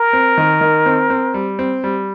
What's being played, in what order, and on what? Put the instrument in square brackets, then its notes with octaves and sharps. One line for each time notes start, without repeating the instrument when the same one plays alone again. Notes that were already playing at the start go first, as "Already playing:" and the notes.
Already playing: [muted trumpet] A#4
[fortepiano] C4
D#3
D#3
C4
C4
G3
C4
G3